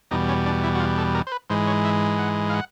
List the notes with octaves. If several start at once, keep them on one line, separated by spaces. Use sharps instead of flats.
E2 B2 G3 D#4
C#4
D4
E4
F#4
F4
A4
A#4
C5
B4
G#2 E3 G#3 C5
C#5
E5
F#5
F5
F#5